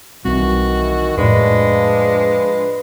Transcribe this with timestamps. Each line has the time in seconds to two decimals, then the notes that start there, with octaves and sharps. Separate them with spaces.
0.25 B1 D#3 E3 G3 C4 F#4
1.17 F2 A2 F3 G#3 D4 B4